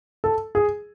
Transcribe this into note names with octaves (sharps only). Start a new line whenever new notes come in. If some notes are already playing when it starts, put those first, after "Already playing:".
A4
G#4